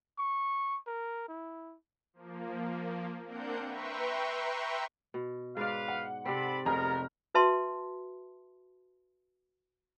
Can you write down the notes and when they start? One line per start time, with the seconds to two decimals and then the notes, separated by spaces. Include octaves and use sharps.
0.18 C#6
0.87 A#4
1.28 E4
2.13 F3 A#3
3.26 A#3 C4 D4 A#4 F#5 G6
3.63 B4 E5 G5 A#5 C6 C#6
5.14 B2
5.57 G#2 B4 D5 F5
5.88 F#5
6.25 C3 C4 A4 D5 B5
6.65 F1 B3 D#4 G#4 A#4 A#5 F6
7.35 F#4 B4 E5 A5 C6